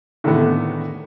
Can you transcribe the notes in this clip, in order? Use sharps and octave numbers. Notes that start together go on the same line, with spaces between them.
A2 D3 D#3 G#3 A3 B3